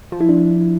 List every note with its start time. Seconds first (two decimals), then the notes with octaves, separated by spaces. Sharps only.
0.12 F3
0.21 E4
0.29 D4